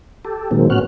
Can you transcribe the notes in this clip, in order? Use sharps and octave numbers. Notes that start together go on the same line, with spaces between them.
G4 A4
A#2 D#3 F#3 G#3 A#3 C4
A2 B3 C#4 F#4 F6 F#6